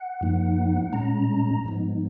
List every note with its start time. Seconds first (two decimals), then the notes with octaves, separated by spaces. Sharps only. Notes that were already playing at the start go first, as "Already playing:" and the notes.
Already playing: F#5
0.21 F#2 F3 A#3 D#4
0.93 A#2 G#3 C#4 A#5
1.64 G#2 F3 G#3 B3 D#4